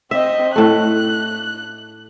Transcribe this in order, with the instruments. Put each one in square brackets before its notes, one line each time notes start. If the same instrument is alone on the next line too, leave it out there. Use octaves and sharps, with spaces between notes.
[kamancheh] C4 D#5 [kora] E5
[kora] A2 A3 [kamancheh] F#6